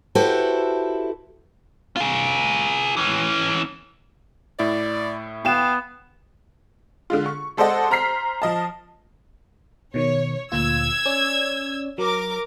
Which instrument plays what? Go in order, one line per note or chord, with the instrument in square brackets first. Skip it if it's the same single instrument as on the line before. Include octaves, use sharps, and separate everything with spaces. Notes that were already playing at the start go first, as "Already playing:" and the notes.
[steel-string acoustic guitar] E4 F#4 G4 A4 B4 C5
[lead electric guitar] F4 G#4
E3 C#4
[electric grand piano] A2 E4 [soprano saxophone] D5
[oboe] B3 [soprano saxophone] F5 [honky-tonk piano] G5 E7
[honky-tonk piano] D3 G#3 F4
C#6
G#3 A4 C5 D5 D#5 F#5
C5 A#5 F6 B6 C7
F3 D#5 A5
[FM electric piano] B2 D#3 [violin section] C#5
[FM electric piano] D2 A#2 F4 [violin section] E6 G#6
[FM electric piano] C#4 C#5 D5
[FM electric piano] F#3 [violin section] A#4 D6